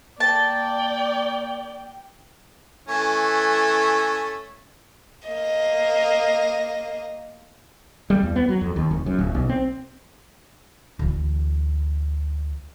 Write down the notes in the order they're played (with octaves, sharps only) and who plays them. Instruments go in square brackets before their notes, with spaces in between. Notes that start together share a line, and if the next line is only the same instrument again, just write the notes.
[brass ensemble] A#3 [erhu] D5 [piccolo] G5 [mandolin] A5
[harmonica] E3 A3 C#4
[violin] A#3 D#5
[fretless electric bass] G3
E2
B3
F#3
F2
D#2
F1
F#2
D1
B1
C4
[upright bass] D2 E3